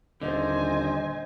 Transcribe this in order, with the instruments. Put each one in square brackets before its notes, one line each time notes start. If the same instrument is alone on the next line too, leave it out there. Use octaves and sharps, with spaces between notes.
[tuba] D#1 [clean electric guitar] D3 [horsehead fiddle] C5 G#5 [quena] D#5